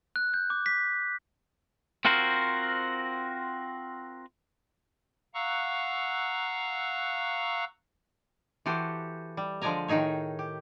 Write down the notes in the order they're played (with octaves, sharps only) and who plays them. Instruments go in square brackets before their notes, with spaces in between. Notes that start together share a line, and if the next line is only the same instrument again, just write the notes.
[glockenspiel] F#6
G6
D6
B6
[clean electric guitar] C4 F4 F#4 A#4 C5
[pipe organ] F5 F#5 A#5 C#6 E6 F#6
[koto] E3 F#4 G4 A4 C5
G3
D3 F3 G#3 D5 G#5 A#5
A2 D#3 D#4 G#4 C#5
G4